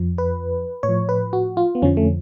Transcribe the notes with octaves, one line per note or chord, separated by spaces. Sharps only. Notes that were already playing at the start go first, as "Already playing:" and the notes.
Already playing: F2 F3
B4
A2 C#5
F3
B4
F#4
F4
B3
F2 D3 F3 C#4
A3